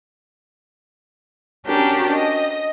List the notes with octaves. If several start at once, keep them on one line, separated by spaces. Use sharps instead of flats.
C#4 D4 F#4 G4 A#4
D#5